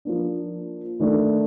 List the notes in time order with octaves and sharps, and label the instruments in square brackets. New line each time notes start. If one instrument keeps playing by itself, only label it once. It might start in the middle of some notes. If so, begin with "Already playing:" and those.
[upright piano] F3 A#3 D4
D#3 A3 D4 A4